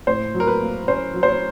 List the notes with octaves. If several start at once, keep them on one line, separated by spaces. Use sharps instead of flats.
A2 C5
F#3
A#4
B4
A#3
C#4 C5
F#3
C5
C#5